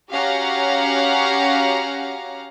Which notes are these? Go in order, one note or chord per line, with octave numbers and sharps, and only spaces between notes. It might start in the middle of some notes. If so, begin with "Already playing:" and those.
C#4 F#4 G4 F5 F#5 A#5